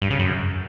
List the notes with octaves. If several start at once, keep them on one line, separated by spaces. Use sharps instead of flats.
G2
C#3
F#2